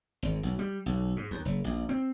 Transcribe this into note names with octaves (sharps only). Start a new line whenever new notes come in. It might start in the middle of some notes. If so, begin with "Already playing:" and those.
G#1
B1
G3
B1
G#2
D#2
F#1
A#1
C4